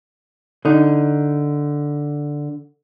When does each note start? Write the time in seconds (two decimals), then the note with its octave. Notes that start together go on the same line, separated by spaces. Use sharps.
0.65 D3 D#4